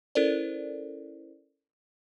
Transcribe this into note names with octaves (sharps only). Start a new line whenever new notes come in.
C#4 E4 A4 A#4 C5 D5